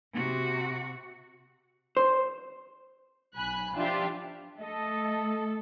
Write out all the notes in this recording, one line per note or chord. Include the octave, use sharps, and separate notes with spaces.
C3 F#4
C5
B1 G#5 B5 F#6
F3 D4 F4 G4 E5
A3 A4 D#5